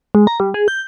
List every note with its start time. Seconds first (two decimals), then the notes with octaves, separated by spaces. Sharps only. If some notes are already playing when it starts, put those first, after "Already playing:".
0.15 G#3
0.27 A#5
0.40 G3
0.54 G#4
0.68 G6